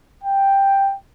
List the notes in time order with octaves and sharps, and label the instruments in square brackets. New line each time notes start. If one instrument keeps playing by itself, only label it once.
[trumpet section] G5